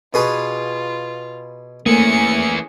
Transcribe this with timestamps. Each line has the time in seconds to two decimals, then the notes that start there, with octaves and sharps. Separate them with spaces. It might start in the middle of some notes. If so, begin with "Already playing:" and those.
0.14 B2 F4 G#4 B4
1.86 E3 A3 A#3 C#4 G#4 C#7